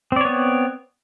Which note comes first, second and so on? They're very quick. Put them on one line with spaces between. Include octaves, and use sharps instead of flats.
C4 D5 C#5 B3